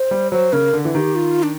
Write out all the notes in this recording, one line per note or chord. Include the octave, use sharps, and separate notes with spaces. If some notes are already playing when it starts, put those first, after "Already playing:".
Already playing: C5
G3
F#3 C5
C#3 A#4
D3
E3
D#3 G4
F4
D4